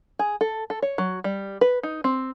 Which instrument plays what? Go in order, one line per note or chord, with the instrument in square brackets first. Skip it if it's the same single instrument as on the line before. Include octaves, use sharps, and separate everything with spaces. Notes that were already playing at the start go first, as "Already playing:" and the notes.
[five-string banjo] G#4
A4
A4
C#5
F#3
G3
B4
D#4
C4